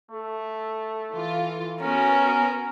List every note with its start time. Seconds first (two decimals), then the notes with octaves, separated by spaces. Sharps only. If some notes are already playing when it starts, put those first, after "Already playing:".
0.11 A3 A4
1.11 E3 F4
1.81 B3 C#4 F#4 A#4